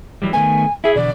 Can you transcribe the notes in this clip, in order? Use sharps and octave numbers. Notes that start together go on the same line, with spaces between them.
E3 F#3 G3
D#3 A3 B3 G#5
E4 G#4 E5
B2 D3 E3 D5